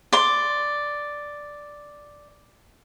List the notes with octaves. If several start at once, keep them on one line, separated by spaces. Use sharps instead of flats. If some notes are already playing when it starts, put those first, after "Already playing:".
D5 C6